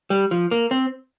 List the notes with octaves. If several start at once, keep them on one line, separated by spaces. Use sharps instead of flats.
G3
F3
A#3
C4